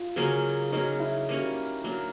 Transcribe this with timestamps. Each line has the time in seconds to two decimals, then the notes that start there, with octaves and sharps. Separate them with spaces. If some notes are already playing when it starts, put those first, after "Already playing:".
Already playing: F4
0.16 C#3 F#3 A#3 C#4
0.72 F#3 A#3 C#4 D#4
1.00 E4
1.29 G3 A#3 C#4 F#4
1.84 F#3 A#3 D4